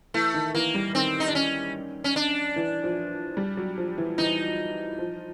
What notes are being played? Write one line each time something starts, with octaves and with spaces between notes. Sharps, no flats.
E3 A3
D#3
E3 A#3
G3
D#3 C4
D#4
D4
C#4
C#4
D4
E3
F3
G3
F#3
F3
E3
E3 D#4
F3